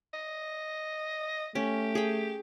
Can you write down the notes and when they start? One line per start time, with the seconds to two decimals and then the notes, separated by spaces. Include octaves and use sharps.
0.13 D#5
1.55 A3 C#4 G4
1.95 G#4 G5